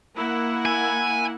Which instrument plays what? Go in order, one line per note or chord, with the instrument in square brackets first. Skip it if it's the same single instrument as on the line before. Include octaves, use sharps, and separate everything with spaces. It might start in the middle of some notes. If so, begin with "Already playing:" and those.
[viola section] A#3 E4 F#5
[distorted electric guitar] G#5